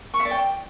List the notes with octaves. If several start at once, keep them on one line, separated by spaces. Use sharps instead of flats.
C#6
E5
D5
G5